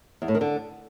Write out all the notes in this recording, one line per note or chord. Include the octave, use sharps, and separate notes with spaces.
E2
A2
D#3
D3